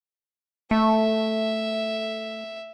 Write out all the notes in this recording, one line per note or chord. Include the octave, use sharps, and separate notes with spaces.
A3 E5